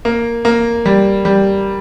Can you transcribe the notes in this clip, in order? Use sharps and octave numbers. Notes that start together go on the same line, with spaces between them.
A#3
A#3
G3
G3